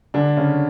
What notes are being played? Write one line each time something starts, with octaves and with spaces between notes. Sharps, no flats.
D3 D4
C#3 C#4